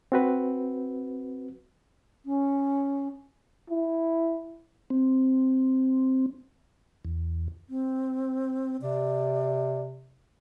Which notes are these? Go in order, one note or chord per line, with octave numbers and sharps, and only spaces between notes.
C4 F#4 B4
C#4
E4
C4
E2
C4
C3 D5